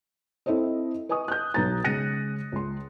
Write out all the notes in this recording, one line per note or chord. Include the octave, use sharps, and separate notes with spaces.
C4 E4 A4 C5 D#5
B4 D#5 G#5 C#6 D#6
F#6 G6
B1 B3 A#5 A6
C#3 G#3 F#6 A#6 C#7 D#7
C#2 C6